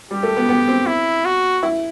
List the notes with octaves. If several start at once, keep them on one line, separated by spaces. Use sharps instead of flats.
G3 G4
A3
B3
B3
C4
E4
F#4
E4